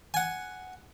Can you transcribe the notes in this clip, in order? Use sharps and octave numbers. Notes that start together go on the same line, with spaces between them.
F#5 G#5